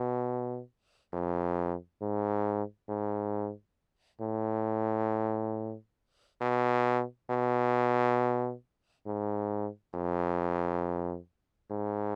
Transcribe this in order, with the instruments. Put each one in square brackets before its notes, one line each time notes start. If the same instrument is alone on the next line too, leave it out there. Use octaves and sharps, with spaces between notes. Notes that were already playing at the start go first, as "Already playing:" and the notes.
Already playing: [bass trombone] B2
F2
G#2
G#2
A2
B2
B2
G#2
F2
G#2